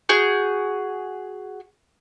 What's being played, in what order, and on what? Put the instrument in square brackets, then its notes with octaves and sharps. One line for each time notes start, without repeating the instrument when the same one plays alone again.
[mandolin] F#4 G#4 G6